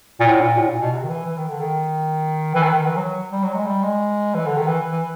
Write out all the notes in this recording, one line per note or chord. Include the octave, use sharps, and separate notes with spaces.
A#2
A2
A#2
A2
A#2
B2
C3
D#3
E3
E3
D#3
D3
D#3
E3
D#3
D#3
E3
F#3
G3
F#3
G#3
G3
G#3
E3
D3
D#3
E3
E3